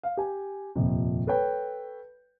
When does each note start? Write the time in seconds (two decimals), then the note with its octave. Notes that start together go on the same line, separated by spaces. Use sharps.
0.03 F5
0.17 G4 G#5
0.76 D#1 F2 C3
1.27 A4 B4 C#5 G5